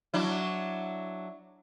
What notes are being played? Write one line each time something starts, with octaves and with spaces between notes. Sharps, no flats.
F#3 D4 E4